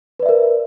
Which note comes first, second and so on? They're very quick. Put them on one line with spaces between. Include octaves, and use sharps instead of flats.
B4 D5 E5 A#4